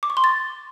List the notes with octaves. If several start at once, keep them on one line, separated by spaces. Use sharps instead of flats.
D6
C#6
C6
A6